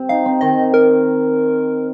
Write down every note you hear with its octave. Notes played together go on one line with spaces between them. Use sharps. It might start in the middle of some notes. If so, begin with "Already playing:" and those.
Already playing: C4
D#4 F5
C4
D#3 D#5
A#4